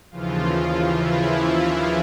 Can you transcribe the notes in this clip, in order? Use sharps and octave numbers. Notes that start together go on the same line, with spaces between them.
D#2 C#3 E3 F3 F4
F3 F4
E3 E4
E3 E4